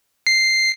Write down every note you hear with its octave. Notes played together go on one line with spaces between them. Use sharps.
C7